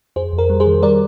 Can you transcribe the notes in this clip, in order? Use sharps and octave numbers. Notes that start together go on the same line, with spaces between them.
F2 G#4 C5
F2
A#4
G3
G#4 C5
D#3
G3 A#4 D5